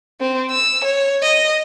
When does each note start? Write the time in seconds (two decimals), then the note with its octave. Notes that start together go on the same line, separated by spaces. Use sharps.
0.21 C4
0.51 E6
0.85 C#5
1.23 D#5